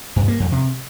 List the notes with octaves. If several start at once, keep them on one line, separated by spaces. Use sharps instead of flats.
G2
A#3
F2
C3